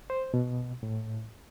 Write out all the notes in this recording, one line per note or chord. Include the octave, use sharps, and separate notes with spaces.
C5
B2
A2